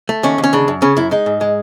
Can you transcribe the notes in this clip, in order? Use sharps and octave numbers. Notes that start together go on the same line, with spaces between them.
A3
D#2 C#4
D#2
C#4
C#3 D4
F#2
C#3 C#4
F#2 E4
G#3 D#4
G#2
G#3